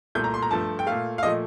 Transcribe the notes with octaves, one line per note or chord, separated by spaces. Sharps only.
C2 A#2 A3 G6
A#5
C6
A#5
G2 F3 A3 A5
G5
A#2 A3 F5
F5
A#2 F3 A3 D#5